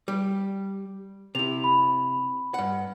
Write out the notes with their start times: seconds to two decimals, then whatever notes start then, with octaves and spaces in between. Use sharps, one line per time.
0.08 G3
1.35 C3 E4 F7
1.64 B5
2.54 G2 F#5